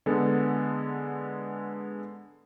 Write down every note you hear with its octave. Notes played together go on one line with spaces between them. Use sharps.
D3 G#3 B3 A4